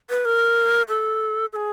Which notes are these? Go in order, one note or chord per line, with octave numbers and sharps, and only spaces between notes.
B4
A#4
A4
A4
G#4